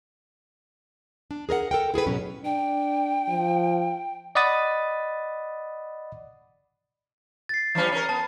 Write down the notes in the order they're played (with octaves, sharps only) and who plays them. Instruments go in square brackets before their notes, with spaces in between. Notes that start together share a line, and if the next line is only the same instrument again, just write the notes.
[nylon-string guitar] D4
G#4 A#4 D5 F#5
A4 A#4 G5
E4 G#4 A4 B4
G#2 B2 F#3 C#4
[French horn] D4 [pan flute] G5
[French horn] F3
[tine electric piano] D5 D#5 F#5 B5 D#6 A6
[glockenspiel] A6 C7
[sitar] E3 G3 C#4
C#4 A#4
[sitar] B3 [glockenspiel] A5